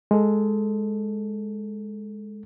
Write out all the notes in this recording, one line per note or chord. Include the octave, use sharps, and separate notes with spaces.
G#3 A4